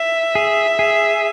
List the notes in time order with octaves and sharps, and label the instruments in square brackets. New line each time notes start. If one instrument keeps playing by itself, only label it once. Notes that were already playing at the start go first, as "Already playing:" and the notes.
Already playing: [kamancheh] E5
[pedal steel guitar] G#4
G#4